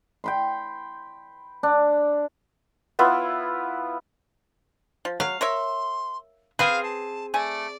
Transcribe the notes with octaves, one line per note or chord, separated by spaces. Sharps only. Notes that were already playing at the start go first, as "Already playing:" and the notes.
G5 B5 C6
D4
B3 E4 F4 B4
F3
F#3 F5
A#4 C#5 E5 C6
C4 G#4 B4 C5 F5
A5
A3 D5 G#5